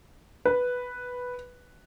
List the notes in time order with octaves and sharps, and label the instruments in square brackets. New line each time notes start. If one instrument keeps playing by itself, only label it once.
[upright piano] B4